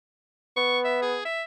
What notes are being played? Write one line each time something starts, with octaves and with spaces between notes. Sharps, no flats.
B3 C#6
E5
G#4
E5